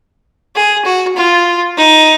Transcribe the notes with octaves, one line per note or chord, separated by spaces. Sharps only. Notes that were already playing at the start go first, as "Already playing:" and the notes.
G#4
F#4
F4
D#4